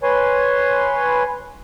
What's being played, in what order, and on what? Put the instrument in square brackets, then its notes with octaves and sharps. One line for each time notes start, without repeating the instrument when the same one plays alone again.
[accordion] B4 C#5 G#5 C6